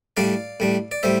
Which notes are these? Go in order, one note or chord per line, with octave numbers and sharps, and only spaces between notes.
A2 G3 D4 D5 F5
A2 G3 D4
D5
A2 G3 C5 E5